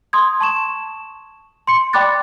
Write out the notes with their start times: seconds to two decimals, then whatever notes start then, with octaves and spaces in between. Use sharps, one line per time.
0.13 C6 D#6 G#6
0.41 A5 C#6 E7
1.67 C6 C#7
1.93 D5 G5 B5 D6 F#6 A6